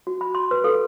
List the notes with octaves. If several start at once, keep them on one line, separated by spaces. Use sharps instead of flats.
F#4
B5
C6
B4
A4